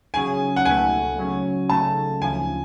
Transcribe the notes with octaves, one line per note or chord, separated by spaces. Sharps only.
C#3 F#3 C#4 G#4 G#5
F#5
C#2 B2 A3 G#5
C#3 F#3 C#4
C#3 F#3 A3 A5
D2 C#3 F3 G#5